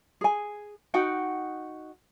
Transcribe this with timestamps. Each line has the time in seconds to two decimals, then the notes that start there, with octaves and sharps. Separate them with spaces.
0.21 G#4 G#5
0.94 D#4 F#4 F#5 G5